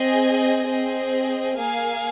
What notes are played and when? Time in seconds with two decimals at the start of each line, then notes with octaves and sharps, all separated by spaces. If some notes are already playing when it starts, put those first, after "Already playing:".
Already playing: C4 G#4 D#5 G#5
0.66 C4 G#4 D#5
1.58 A#3 G#4 F5 G#5